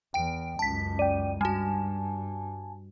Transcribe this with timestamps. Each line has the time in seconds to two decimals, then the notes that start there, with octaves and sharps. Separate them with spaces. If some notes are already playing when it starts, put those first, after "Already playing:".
0.14 E2 G5 D7
0.59 C#2 F#2 A5 B6
0.99 D5 G5 D#7
1.41 G2 G3 F#4 G#5 A5